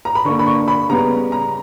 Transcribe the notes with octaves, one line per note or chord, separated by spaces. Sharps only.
A#5
B5
D3 A#3 C#6
B5
C#6
B5
C#3 G3 B3 A#5
A#5